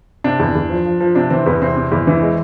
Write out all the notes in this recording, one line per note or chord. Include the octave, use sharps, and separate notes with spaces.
C3 D4
E2
E2
F3
F3
F3
C3 D4
E3 C4
E2 B3
C3 C4
C3
E2
E3
G#3